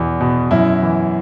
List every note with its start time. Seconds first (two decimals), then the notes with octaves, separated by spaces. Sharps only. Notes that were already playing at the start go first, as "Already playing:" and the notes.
Already playing: E2 B2 E3
0.21 B2
0.51 F#2 E4
0.82 E3